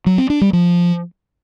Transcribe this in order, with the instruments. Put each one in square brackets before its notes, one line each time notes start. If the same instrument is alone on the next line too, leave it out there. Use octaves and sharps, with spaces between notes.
[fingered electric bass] F#3
C4
D4
G3
F3